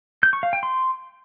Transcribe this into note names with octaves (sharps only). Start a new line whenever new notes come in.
G6
C#6
F5
G5
C6